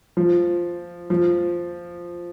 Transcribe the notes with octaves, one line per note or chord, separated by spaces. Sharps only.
F3
F3